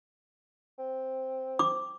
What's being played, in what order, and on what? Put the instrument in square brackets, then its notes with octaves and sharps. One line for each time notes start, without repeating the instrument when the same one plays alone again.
[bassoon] C4
[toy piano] D6